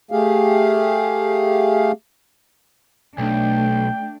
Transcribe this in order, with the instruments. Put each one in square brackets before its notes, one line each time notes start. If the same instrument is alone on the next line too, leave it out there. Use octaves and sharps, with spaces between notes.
[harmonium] A3 G4 G#4 F5
[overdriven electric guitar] B1 [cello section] A3 D4 [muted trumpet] G5